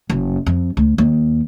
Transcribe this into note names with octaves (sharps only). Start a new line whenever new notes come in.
F#1
F2
D2
D#2